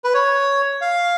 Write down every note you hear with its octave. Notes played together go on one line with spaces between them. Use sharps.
B4
C#5
F5